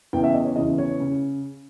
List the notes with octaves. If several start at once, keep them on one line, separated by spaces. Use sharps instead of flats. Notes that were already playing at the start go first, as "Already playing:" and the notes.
E2 C#3 E3 G5
E5
D#5
C#5
E2 C#3 E3 D#5
C#5
C#3